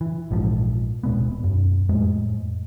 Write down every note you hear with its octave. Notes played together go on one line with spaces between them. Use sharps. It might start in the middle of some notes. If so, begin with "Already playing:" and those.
E3
A#1 G#2 F3
D1 B2 G#3 B3
F#2
F2 A2 G#3